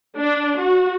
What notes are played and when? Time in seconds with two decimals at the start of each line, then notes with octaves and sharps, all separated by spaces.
0.17 D4
0.59 F#4